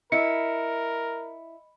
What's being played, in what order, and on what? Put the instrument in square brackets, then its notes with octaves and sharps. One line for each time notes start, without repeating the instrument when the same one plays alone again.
[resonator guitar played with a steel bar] E4 [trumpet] A#4 [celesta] D#5 C#7